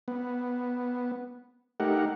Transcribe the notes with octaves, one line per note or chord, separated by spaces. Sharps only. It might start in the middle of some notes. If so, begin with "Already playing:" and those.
B3
A3 D#4 G4 A#4 F#5